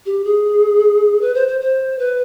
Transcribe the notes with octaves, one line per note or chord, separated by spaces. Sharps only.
G4
G#4
B4
C5
C5
C5
B4